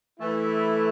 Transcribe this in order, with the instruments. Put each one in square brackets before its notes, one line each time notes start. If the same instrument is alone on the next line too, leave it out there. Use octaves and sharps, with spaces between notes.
[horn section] E3 A3 E4